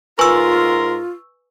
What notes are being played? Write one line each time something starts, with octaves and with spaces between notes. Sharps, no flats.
G#2 F4 A#4 B4 G#5 C6 C#6 E6